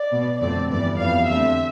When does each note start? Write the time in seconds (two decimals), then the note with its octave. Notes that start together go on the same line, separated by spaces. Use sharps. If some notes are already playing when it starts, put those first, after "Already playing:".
Already playing: D5
0.12 B2 B3
0.40 F2 D3 A3 C4 D5
0.70 G2 E3 G3 B3 D5
0.98 F2 E3 G3 B3 F5
1.28 E2 D3 A3 C4 E5